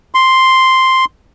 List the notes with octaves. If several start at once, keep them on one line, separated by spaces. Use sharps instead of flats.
C6